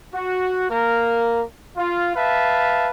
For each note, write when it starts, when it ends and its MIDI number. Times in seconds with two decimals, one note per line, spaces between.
0.14 0.69 66
0.70 1.43 58
0.70 1.43 70
1.77 2.14 65
2.16 2.90 71
2.16 2.90 76
2.16 2.90 77
2.16 2.90 81